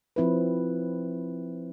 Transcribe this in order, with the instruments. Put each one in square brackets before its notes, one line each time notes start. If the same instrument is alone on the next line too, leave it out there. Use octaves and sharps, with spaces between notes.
[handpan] F3 C4 E4 B4